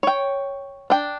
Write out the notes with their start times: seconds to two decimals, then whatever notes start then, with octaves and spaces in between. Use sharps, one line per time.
0.03 C#5 G5
0.90 D4 G5